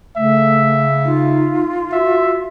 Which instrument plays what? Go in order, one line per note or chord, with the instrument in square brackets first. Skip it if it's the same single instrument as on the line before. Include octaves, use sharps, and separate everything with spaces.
[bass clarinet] C#3 [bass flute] A3 [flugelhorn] E5
[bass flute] D#4 [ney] F4
[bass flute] F#4 [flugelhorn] E5